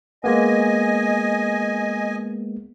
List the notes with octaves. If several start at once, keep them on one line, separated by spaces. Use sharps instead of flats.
G#3 A#3 B3 D#5 G#5